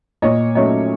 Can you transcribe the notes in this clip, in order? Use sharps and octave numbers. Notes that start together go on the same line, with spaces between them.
A#2 C#5 D#5
F#3 A3 C#4 C#5 D#5